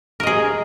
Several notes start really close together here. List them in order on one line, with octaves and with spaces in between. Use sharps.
A#4 D#5 G#4